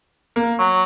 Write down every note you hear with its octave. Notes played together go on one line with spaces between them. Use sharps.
A#3
F#3